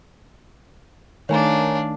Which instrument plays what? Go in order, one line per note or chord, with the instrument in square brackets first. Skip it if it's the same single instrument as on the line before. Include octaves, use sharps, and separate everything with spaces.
[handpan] D#3 A3 [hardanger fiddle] D4 F5 [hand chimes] C#5 G#5 A#5